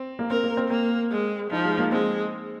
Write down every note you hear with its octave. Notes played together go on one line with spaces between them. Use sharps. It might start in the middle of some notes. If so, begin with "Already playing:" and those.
Already playing: C4
A#3
C4 A#4
A#3
C4
A#3 C4
G#3
F3 D#4
G#3
A#3
G#3 C4